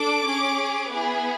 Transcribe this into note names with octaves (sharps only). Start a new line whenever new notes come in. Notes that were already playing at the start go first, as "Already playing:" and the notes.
Already playing: D4 A4 D6
C#4 G#4
B3 E4 G#4